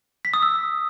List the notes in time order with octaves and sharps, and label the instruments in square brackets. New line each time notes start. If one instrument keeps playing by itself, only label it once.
[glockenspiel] B6
D#6
E6